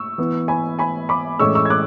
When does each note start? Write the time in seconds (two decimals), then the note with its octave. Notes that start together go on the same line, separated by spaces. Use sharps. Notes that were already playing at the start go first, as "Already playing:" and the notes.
Already playing: C#6 E6
0.18 E3 B3
0.48 G#5 B5
0.79 G#5 B5
1.09 B5 D6
1.39 A2 E3 G#3 C#4 C#6 E6
1.55 C#6 E6
1.65 G#6
1.70 D6 F#6